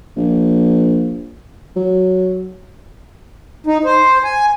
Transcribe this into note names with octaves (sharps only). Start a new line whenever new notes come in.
A#1
F#3
D#4
C5
G#5